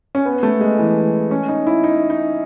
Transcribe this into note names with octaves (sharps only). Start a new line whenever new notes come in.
C#4
B3
A3
G#3
E3
C#4
D#4
E4
D#4
D#4